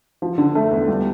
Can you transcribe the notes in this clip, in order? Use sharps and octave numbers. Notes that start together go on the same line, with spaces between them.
F3
D3
A3
E2
G3